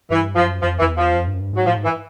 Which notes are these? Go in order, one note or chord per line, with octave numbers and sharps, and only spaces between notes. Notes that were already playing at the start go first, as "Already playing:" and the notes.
G2 E3
F#2 F3
F2 F3
F2 E3
E2
F3
F2
G2
F#2
G2
G#2 F#3
A2 F3
G#2
E3